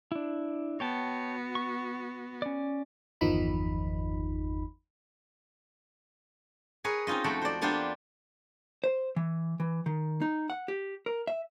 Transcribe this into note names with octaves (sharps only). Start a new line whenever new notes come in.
D4 E4
B3 F#4 C#5 G5 A5
C#6
C#4 D5
G1 E2 D#3 F3 D#4 B5
G#4 A#4 B4 C#5
C4 C#4 D#4 F4 D#5
F2 A3 F#4 A4 G5 B5
C5 D5
A#3 B3 D4 F4 G4 C5
C5
E3
E3
D#3
D#4
F#5
G4
A#4
E5